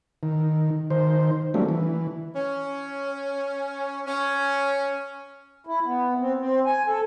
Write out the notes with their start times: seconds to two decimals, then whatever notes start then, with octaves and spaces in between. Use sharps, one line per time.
0.23 D#3
0.90 D#3 C5
1.54 F#3 G3 A3 A#3 C#4 D4
1.69 E3
2.36 C#4
4.07 C#4
5.67 E4
5.86 B3
6.20 C4
6.39 C4
6.66 G#5
6.87 A4